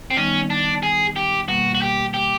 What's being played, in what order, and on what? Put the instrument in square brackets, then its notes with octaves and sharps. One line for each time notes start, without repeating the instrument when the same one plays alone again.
[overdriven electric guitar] C4
[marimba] D#3 G3 B3 D#4 [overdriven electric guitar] C#4
[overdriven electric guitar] D4
G#4
G4
[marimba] B2 G3 A#3 [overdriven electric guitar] F#4
[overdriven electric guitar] F#4
G4
G4